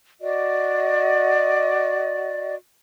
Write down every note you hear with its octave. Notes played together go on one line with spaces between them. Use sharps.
F#4 D5 D#5